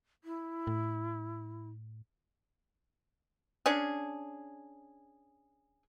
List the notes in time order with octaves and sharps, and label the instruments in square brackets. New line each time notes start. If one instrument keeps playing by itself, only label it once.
[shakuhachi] E4
[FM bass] A2
[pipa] C#4 D4 G#4